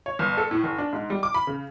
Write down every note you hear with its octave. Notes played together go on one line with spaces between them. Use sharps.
C#5
G1
A4
A2
F#1
D4
G#2
G3
D6
B5
C#3